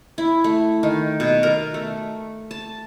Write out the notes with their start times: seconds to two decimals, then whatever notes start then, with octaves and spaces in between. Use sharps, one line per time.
0.18 E4
0.44 A3
0.83 D#3
1.20 B2
1.43 A#4
1.74 A3
2.51 A5